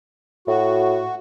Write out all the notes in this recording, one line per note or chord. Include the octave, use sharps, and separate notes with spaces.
A2 F#4